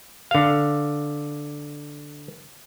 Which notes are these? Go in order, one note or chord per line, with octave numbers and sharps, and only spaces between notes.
D3 F5